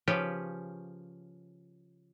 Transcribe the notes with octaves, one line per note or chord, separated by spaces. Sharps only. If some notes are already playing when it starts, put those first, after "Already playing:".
C#3 F3 C#4 G4 B4